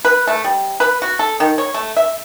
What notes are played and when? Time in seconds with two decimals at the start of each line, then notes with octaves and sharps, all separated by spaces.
0.05 B4
0.28 A3
0.44 G3
0.80 B4
1.02 F#4
1.19 A4
1.40 D#3
1.58 C#5
1.74 A3
1.97 E5